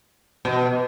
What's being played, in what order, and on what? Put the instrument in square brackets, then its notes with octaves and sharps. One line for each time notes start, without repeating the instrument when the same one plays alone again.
[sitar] B2